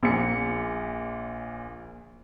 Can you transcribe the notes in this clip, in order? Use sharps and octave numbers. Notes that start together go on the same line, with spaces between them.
A#1 A#2 C#7